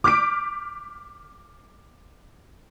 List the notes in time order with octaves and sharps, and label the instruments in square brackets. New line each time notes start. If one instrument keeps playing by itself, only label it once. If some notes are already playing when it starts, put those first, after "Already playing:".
[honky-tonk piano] D6 F6 G6 B6 D7